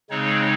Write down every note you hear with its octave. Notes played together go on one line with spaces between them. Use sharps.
C#3 G#3 C4 D#4 C#5